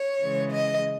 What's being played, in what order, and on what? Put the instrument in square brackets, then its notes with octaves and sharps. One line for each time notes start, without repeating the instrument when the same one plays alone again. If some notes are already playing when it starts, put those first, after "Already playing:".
Already playing: [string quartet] C#5
C#3 E3 G#3
D#5